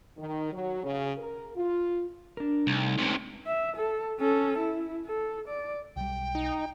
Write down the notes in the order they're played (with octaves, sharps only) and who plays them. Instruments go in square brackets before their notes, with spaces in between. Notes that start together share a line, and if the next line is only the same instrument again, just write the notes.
[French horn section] D#3
F#3
C#3
A#4
F4
[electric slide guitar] D4 A#4
[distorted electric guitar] C2 [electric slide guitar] A3 D#4
[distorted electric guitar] C#2 C3
[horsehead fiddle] E5
A4
C#4 A4
E4
A4
D5
[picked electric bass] B1 G3 [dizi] G5
[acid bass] D#4